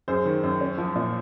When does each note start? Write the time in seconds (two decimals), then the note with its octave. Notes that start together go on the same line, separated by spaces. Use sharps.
0.08 F#2 G#4 C5
0.25 D#3
0.43 F#2
0.61 C#4
0.78 F3
0.96 A#2